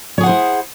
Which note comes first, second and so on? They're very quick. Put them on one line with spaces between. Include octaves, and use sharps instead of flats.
C#5 G#4 F#5 C5 E4